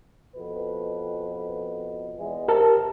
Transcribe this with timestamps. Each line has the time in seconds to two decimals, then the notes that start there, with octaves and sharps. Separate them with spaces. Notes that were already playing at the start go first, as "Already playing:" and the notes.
0.36 F2 B2 B4
2.17 E2 E3 G#3
2.48 C3 G4 A#4 A5